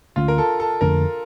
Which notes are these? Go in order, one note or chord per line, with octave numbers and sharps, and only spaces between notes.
D2 D3 A3 C#4 F4
A#4
A4
A4
F2 D3 A3 D4 A#4